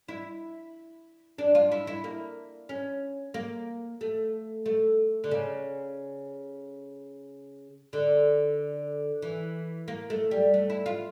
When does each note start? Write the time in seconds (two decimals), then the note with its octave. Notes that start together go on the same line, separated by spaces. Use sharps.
0.08 E4
1.38 D4
1.55 F4
1.72 E4
1.87 E4
2.04 A#3
2.69 C#4
3.34 A#3
4.01 A3
4.66 A3
5.24 D3
5.31 C#3
7.93 D3
9.22 E3
9.88 A#3
10.10 A3
10.31 G3
10.54 A3
10.70 E4
10.86 F4